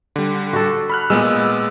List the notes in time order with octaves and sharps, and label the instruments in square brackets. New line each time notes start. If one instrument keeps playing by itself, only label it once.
[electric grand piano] D3 G3
[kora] F#4 A4
[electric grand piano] B5 F6 F#6
[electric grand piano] A#2 B3 E6 [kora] G#3